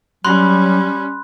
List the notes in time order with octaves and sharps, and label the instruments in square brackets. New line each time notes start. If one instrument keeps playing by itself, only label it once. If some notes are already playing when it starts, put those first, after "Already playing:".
[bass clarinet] F#3 [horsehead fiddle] G3 C#4 [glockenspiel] B5 C6 F#6